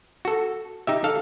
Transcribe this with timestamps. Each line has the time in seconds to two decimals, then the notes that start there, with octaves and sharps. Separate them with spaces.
0.25 F#4 A4
0.87 D#4 G4 E5
1.04 A4 F5